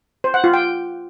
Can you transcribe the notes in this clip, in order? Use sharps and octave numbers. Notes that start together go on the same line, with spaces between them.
C5
F#5
F4
G5